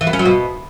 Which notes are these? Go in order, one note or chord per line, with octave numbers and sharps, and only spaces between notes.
E3
B3
C#4
F#3
B2